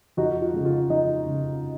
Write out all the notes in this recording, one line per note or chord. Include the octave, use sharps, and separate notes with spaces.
F2 D#4 F#4
F4
C#3 G#3
F4
F2 D#4
C#3 G#3